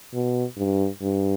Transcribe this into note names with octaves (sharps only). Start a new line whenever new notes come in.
B2
G2
G2